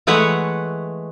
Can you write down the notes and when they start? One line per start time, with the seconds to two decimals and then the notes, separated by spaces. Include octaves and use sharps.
0.07 E3 G#3 A3 B4 C#5 F#5